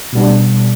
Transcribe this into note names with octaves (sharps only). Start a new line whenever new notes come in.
B2 G3 B3 D4